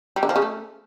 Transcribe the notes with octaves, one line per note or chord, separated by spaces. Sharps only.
G3
D3
F3
C#3
A3